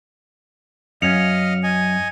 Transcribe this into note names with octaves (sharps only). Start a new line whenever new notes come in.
F#2 C#4 D#5 F5 C#7 F7
D#5 G#5